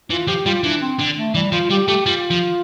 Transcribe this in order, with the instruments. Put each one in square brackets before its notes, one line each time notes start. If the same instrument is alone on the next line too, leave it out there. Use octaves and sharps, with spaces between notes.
[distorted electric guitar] E3 [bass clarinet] F4
[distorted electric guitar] F3 [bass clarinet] G4
[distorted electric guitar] G3 [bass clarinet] F4
[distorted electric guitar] E3 [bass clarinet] D4
[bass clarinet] C4
[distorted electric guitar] D3
[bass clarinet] A3
[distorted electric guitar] E3 [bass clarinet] G3
[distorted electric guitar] F3 [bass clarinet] F4
[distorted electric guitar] G3 [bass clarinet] G4
[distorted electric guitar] A3 [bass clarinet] G4
[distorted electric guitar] G3 [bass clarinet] F4
[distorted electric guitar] F3